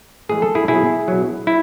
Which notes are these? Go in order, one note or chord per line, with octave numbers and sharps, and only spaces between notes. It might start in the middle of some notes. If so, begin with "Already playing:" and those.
A2 E3 G#3 G#4
A4
E4 G#4
B2 F#3 E4 G#4
B2 F#3
E4